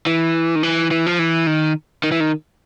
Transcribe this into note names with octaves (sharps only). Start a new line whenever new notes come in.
E3
D#3
E3
E3
F3
E3
D#3
D#3
E3
D#3